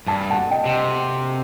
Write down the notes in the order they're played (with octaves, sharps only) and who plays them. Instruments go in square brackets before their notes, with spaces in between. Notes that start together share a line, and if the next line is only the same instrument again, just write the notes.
[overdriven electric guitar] G2 [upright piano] A5
[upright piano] F#5 A5
D#5 G5
[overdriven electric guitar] C3